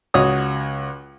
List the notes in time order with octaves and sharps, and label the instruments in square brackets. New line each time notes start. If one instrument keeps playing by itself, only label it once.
[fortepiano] C#2 F#4 C#5 D#6